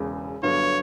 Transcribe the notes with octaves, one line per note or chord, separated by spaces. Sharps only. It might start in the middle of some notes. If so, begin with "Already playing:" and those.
Already playing: E1 E2 C#3
G1 G2 D3 F#3 B3 C#5